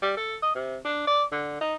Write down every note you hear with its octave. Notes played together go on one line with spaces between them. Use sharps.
G3
A4
D#5
C3
D4
D5
D3
D#4